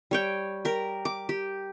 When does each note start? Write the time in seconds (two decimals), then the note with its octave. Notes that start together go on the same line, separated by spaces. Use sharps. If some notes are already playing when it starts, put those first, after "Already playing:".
0.11 G3 C#5 G5
0.65 G4 A#4
1.05 D6
1.29 G4